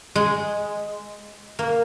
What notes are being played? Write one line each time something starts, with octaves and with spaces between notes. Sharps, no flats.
G#3
A#3